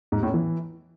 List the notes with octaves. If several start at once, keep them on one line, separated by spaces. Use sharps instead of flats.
G#2
G3
A2
C#4
E3